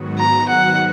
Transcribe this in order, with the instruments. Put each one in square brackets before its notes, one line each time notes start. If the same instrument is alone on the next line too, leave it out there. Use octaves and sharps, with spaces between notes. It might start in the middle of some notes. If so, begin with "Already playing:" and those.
Already playing: [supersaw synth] G#2 D#3 F#3 B3 F#4
[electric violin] A#5
F#5